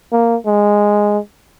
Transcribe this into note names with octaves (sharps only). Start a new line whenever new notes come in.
A#3
G#3